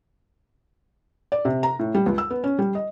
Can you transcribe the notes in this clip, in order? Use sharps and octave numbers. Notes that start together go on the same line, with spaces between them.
D5
C3
A#5
A2
G3
C#2
E6
B3
C#4
G3
D#5